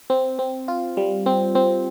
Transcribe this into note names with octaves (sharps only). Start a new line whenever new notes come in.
C4
C4
F4
G3
C4
C4